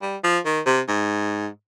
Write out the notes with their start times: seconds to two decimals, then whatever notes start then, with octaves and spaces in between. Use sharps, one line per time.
0.02 G3
0.24 F3
0.45 D#3
0.66 C3
0.88 G#2